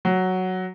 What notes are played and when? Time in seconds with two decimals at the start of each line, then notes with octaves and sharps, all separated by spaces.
0.05 F#3